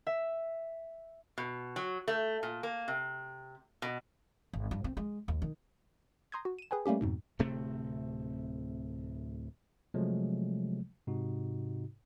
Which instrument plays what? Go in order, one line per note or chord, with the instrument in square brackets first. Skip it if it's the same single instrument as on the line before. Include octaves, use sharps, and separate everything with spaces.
[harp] E5
[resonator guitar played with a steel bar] B2
F#3
A3
A#2
A#3
C3
B2
[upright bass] G#1
G2
C4
G#3
D#2
D#3
[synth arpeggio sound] A#5 C6 D#6 G6 G#6
F#4
D#7 E7
G#4 B4 G5 G#5
G3 A3 A#3 C#4 G4
F2 G#2 B2
[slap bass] D1 C3 A3 C4
[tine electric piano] C3 F3 F#3 G#3 A3
G#2 C3 D#4 F#4